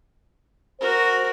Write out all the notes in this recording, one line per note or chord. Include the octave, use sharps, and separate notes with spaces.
F#4 A#4 C5